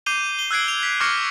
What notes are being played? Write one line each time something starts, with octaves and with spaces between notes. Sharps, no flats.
D6 G6 C7 D#7 F7 G7
G7
E6 F#6 G#6 C7 D7
E6 F7
B6
C#6 D6 F6 G#6 A#6 C#7